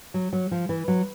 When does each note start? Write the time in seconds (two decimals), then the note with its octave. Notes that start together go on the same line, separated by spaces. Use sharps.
0.14 F#3
0.33 F#3
0.51 F3
0.69 E3
0.88 F#3